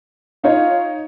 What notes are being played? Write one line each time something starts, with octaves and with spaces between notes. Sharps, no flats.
D#4 F4 C#5 D#5